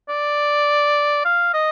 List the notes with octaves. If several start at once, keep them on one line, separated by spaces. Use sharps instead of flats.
D5
F5
D#5